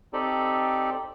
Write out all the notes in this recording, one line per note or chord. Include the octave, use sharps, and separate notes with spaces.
C4 D#4 G4 A4 D5